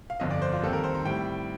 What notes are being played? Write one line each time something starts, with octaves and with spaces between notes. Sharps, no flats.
F5
G1 F2 D3 D#5
D5
C5
F4
D#2 D#3 G3 C4 A4
A#4
C5
A#5
A2 G3 C4 G5